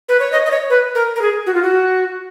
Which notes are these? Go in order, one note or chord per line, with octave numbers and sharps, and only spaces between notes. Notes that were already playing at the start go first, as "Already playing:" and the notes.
B4
C#5
D#5
D#5
C#5
B4
A#4
A#4
G#4
F#4
F4
F#4